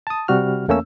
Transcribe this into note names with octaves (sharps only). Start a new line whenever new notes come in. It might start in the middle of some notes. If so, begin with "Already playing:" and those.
A5 D#6
C3 G3 F#4 F6
E2 A3 A#3 C#4 E6